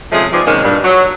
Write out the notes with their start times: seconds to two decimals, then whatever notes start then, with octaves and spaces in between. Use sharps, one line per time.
0.12 C3 F3 G#3 A3 C#4 G#4
0.33 G#2 F3 B3 C4 G#4 D5
0.47 C3 D#3 G#3 A#3 C#4
0.63 G2 A#2
0.83 F#3